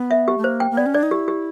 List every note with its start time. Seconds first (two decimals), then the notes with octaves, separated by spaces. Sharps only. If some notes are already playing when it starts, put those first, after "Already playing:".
Already playing: B3
0.11 E5
0.28 G4
0.38 A3
0.44 A#3 C5
0.60 G5
0.71 A#3
0.77 B3 D5
0.86 C#4
0.94 D4 D5
1.03 D#4
1.11 E4 G4
1.28 G4